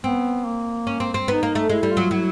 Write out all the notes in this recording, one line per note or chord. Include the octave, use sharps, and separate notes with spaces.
B3 C4
A#3
C#4
C4
C4
B3 D#4
A#3
A3
G#3 E4
G3
F4
F#3
F#3 E4